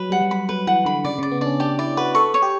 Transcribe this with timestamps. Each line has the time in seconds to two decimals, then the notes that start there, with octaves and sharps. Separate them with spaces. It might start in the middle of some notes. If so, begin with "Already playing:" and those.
Already playing: F#3 B4
0.10 G3 F#5
0.21 F#3
0.31 B5
0.49 F#3 B4
0.67 E3 F#5
0.85 D3 B5
1.04 C#3 D5
1.19 C#3 D5
1.31 B3
1.41 D4 D5
1.46 C#4
1.60 D4 G4
1.79 E4 D5
1.97 F#4 B4
2.15 A4 C#6
2.34 C#5
2.42 G4